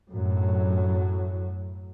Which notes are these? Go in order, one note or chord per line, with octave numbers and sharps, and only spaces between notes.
F#2 A2 F#3